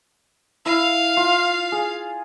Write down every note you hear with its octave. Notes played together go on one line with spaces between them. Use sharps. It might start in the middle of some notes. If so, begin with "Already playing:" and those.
E4 F5
F4
G#4